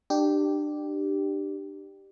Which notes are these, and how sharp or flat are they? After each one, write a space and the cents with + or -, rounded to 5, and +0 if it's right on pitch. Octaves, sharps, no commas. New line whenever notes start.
D4 +30 G4 -5